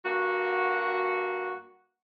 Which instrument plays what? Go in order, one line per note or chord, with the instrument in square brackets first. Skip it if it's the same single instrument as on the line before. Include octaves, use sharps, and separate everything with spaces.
[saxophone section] G2 A#3 F#4